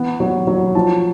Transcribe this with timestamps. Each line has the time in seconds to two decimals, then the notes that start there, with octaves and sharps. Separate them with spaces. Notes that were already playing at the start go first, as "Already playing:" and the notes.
Already playing: E3 B3
0.20 F#3
0.47 F#3
0.75 F3 A5